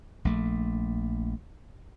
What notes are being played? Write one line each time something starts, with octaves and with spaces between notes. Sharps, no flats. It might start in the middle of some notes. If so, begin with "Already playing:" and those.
A#1 A3